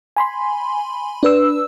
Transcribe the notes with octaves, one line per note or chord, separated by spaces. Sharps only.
G#5 B5 C6
D4 B4 E6